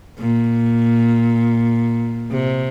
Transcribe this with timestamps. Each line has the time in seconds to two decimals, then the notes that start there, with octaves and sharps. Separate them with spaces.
0.18 A#2
2.31 C3